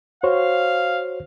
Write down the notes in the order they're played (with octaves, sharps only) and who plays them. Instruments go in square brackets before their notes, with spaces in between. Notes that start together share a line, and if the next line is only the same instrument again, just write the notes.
[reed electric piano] F#4 C5 C#5 [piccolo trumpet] F5